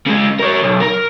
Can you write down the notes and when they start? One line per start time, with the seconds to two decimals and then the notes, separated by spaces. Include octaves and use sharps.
0.06 C#3 G#3
0.39 A#4 C#5
0.63 B1
0.81 A#4